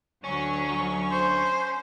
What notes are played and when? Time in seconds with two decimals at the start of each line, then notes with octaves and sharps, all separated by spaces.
0.24 D2 F#3 C#4 C#6
1.11 C5